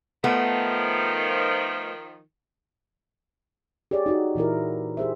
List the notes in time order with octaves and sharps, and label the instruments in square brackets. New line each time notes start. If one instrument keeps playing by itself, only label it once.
[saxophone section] D#3 F3 [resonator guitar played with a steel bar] A3 B3
[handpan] G4 G#4 C#5 D5
D#4 F#4 G4
A#2 E3 E4 A#4
G4 G#4 C5 E5